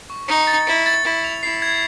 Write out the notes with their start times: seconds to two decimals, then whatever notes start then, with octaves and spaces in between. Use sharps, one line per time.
0.10 C#6
0.28 D#4 C#7
0.47 A6
0.66 E4 C#7
0.86 A6
1.04 E4 A6
1.24 F7
1.43 E4 C7
1.62 G#6